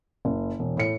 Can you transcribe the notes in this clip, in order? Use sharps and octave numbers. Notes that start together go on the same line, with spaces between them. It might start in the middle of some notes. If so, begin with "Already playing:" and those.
F#1
E1
A2 C#7